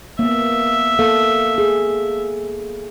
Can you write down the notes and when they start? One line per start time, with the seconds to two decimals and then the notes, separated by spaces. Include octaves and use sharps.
0.19 A#3 B3 E5
0.99 A#3 A4 F5
1.58 G#4